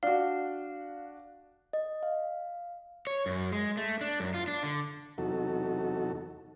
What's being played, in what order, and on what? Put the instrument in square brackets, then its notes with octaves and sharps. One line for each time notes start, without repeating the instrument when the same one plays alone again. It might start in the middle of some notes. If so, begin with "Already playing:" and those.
[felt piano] D4 F#4 [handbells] F5
[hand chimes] D#5
F5
[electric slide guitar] C#5
F#2
G#3
A3
D4
F#2
F4
D4
D3
[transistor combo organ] E2 C3 F#3 D#4 F#4 A4